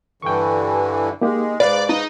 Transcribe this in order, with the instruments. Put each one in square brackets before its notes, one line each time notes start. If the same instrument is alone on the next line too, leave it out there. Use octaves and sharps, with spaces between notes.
[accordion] G2 D3 E3 [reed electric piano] G5 C#6
[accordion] G#3 [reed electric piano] A#3 D#4 G4
[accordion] G#2 [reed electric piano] B4 F5 F#6 [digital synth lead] D5
[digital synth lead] D#4